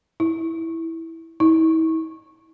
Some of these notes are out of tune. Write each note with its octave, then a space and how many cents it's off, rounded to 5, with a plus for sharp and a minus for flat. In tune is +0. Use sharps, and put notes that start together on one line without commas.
E4 -10
E4 -40